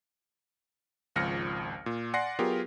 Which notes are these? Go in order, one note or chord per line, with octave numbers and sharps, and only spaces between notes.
G#1 C#2 F3 F6 A#6 C#7
A#2
D5 F#5 G#5 C6 A#6 C7
F#3 B3 F4 G4 G#4 A#4